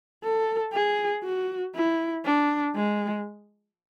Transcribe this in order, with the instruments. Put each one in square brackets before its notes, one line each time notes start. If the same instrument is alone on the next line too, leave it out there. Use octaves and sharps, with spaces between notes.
[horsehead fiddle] A4
G#4
F#4
E4
D4
G#3